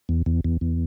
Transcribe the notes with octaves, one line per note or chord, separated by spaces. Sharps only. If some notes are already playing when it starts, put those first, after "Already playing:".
E2
E2
E2
E2